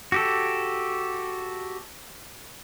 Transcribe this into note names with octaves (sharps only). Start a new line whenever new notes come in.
F#4 G4 A4